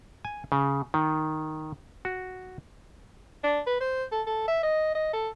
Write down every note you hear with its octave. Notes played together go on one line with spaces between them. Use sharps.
G#5
C#3
D#3
F#4
D4
B4
C5
A4
A4
E5
D#5
D#5
A4